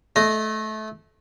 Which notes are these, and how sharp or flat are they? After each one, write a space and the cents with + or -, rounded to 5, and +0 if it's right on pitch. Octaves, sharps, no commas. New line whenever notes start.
A3 -20 D#5 +0